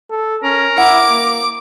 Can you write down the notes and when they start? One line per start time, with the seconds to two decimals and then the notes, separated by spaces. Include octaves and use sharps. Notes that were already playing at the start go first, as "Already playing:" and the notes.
0.10 A4
0.43 C#4 A#4
0.78 E4 F#5 D6 D7
1.10 A#3